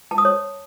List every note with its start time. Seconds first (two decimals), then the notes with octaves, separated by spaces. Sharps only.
0.11 A5
0.18 D#6
0.25 C#5